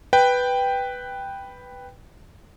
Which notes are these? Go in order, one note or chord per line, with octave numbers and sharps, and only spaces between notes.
B4 G5